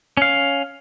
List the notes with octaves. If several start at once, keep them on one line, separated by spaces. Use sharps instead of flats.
C#4 F5